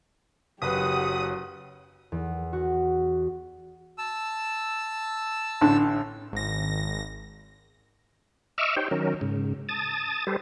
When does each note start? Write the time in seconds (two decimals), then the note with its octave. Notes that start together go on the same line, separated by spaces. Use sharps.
0.62 F#1 F#3 G4 B4 F#5 D#6
2.12 E2
2.53 F#4
3.98 A5 E6
5.61 A1 D3
6.33 G#1 A#6
8.58 D#5 E5 C#6 D6 E6 F6
8.76 D#4 G4 C5 C#5 G5
8.91 D#3 F#3 C#4 A#4
9.21 G#2 C#3
9.69 A5 D#6 A6
10.27 G3 G4 A4 B4 C5